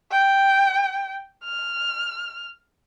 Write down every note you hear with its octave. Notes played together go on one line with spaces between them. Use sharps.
G5
F6